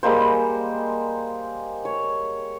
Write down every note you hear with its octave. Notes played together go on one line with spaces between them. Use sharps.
G3 G#3 A#3 C5
C#5